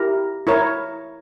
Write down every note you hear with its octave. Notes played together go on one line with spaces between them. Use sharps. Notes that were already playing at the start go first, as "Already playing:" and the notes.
Already playing: E4 G4 A#4
E4 A#4 C#5